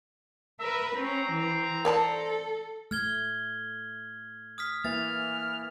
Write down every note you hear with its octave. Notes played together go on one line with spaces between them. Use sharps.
A#4 B4 E5
C4 C#4 A#5
E3
A4 A#4 D5 A5
A3 F6 G#6 G7
D#6 F6 B6
E3 A#3 F6 A6